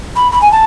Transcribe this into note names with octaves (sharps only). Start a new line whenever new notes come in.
B5
B5
G#5
A5